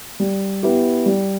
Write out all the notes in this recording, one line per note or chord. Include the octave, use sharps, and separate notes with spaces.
G3
B3 E4 G4
G3